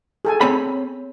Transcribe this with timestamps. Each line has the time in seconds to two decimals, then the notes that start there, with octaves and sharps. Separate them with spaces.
0.25 G#4 A4 G#5
0.41 C4 C#5 B5